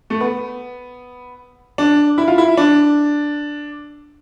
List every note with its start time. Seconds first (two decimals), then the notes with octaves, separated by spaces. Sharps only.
0.10 A3
0.20 B3
1.78 D4
2.18 E4
2.28 F4
2.38 E4
2.57 D4